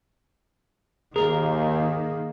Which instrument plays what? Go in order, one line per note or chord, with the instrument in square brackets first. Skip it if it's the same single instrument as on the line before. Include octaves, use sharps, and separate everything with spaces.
[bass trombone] D#2 [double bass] D#3 A#3 [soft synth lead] G#4 [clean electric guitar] A#4